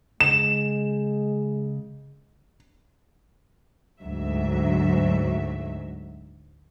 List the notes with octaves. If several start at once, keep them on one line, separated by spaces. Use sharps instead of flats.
C#3 G#3 E7
D2 G#2 F#3 E5